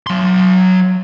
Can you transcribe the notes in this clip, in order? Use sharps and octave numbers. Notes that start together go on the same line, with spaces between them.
F#3 C6